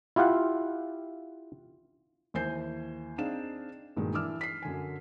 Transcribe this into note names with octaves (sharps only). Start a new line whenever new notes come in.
E4 F4 G4 F5 F#5
D#2 E3 C5 G#5 G6 C7
C4 D4 D#4 G#4 F5 E7
G2 A#2 D#3 F#3 G#3
E3 D4 D6 E6 F6
B6 C7
F#2 D3 G#5